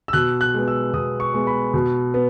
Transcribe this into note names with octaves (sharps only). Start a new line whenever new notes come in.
E6
B2 F#6
F#6
G#3 B3
E6
B2 D#6
C#6
G#3 B3
B5
B2
B3